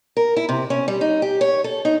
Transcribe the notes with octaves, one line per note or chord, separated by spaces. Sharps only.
A#4
E4
C3
C#4
G3
D#4
G4
C#5
A4
D#4